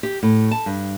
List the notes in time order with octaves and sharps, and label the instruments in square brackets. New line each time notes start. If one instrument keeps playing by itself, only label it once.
[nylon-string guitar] G4
A2
A5
G2